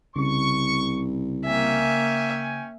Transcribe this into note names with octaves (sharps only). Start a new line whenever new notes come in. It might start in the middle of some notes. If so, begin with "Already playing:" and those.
C2 C#3 C#6
A#3 C#4 E5 G5 G#5